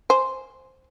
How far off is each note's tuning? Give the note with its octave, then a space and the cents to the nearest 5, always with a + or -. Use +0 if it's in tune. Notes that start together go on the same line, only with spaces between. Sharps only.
C5 +0 G#5 +0